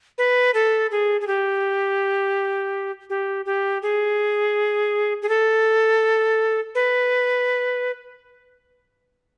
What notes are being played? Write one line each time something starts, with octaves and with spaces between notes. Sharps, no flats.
B4
A4
G#4
G#4
G4
G4
G4
G#4
G#4
A4
B4